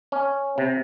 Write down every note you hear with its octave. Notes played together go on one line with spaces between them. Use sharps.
C#4
C3